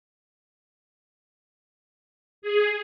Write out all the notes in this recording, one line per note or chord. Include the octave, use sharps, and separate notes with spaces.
G#4